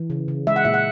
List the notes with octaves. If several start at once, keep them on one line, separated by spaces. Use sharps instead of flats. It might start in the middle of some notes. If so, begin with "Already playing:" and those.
Already playing: E3
C#3
C#3
G#3 E5
F#5
A#2 E5
F#5